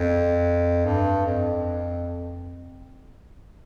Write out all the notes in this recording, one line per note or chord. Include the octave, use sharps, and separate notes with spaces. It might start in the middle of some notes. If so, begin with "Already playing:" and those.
Already playing: F2
G2
F2